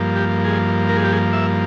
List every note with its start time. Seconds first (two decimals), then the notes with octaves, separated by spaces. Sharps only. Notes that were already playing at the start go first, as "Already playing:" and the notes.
Already playing: G2 F3 A#3
0.16 G4
0.45 G#4
0.89 A#4
0.97 G#4
1.04 G4
1.12 G#4
1.33 E5